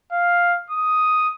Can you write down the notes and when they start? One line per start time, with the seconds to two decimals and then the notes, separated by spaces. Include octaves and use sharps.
0.12 F5
0.70 D#6